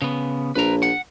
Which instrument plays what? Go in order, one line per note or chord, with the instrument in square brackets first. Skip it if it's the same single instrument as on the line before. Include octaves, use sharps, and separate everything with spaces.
[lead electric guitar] C#3 B3
[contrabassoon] A#1 [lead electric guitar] B4 A#5
[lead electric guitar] F#5